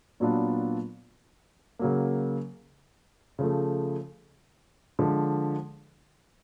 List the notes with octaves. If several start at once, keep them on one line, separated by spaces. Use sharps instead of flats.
A#2 F#3 B3 D4 F4
C#3 F#3 A#3
C#3 F3 A3
D3 F3 G#3